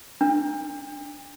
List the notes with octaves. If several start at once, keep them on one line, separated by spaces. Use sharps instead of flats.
D4